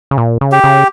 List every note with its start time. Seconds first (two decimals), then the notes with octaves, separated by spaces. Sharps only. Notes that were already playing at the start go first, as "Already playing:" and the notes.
0.11 C#3
0.18 A#2
0.41 C#3
0.52 G4
0.64 C#3